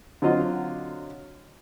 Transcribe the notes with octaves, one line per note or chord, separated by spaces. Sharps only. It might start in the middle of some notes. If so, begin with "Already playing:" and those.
D3 F#3 C4 F4 D#5 F5